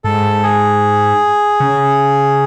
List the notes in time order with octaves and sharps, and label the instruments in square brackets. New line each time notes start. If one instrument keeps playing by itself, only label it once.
[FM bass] G#2 [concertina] A4
[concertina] G#4
[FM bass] C#3